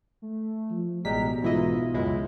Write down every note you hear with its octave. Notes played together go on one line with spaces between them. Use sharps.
A3
F3
A1 B2 G3 G#3 G5 A#5 B6
B1 G#2 E3 E4 F4 D#5 E5
C#2 F#2 G#3 D#4 E4